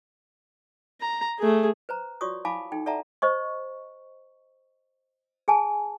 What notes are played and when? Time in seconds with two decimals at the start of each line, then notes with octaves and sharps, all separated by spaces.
1.01 A#5
1.39 A3 G#4
1.89 B4 C5 A#5
2.21 F4 F#4 C#5 D5 C#6 D#6
2.45 E4 F5 G#5 A5 B5 D6
2.72 D#4 A4 G5
2.86 A4 D5 E5 F#5 A5 A#5
3.22 C5 D#5 C#6
5.48 G#4 G#5 A5